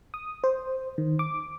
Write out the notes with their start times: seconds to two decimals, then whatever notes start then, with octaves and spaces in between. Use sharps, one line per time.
0.14 D#6
0.44 C5
0.98 D#3
1.19 D6